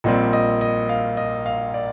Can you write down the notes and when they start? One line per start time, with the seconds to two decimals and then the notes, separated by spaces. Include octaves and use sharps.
0.04 A#1 A#2 G3 C4 D#5
0.33 D#5
0.61 D#5
0.89 F5
1.17 D#5
1.46 F5
1.74 D5